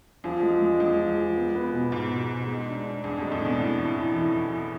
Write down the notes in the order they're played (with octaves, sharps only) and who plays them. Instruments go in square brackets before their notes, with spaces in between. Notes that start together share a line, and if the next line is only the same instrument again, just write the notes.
[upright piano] E2 [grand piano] F3
[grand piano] G#3
G#3
[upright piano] E2 [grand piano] G#3
[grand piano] F3
G#3
B3
B3
B2
[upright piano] G#2 [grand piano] B2
[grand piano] B2
B2
G#3
D4
D4
[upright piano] E2 [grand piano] D4
[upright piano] F2 [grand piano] G#3
[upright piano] A2
[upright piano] B2 [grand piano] D4
[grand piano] E4
E3
E4
E3
E3
E3